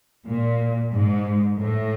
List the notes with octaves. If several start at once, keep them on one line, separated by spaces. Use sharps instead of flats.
A#2
G#2
A2